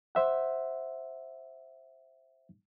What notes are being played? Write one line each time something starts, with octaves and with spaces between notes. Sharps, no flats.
C5 E5 F#5